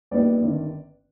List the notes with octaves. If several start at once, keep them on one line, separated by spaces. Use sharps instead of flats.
A#1 A#2 G3 B3 D#4 D5
G1 G2 D#3